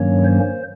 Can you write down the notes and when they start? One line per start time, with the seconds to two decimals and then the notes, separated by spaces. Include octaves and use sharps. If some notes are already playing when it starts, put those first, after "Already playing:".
Already playing: G2 D#3 F#3 A#3 C#4 C#5
0.24 C5